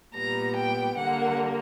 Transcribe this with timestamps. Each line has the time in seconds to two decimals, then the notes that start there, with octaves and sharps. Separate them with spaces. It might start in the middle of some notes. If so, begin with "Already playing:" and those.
0.14 A#2 G3 B3 A#5
0.56 G5
0.97 D3 G3 A#3 F#5